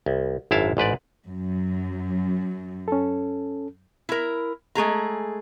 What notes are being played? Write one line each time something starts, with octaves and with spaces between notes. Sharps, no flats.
C2
G#1 F#2 E4 F5 A5
A1 G#2 B4 D5
F#2
C#4 A4
E4 A#4
G#3 A3 G#4 A#5